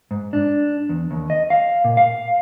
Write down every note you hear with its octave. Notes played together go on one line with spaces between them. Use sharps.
G#2
D4
E2
D#2
D#5
F5
A#2
F5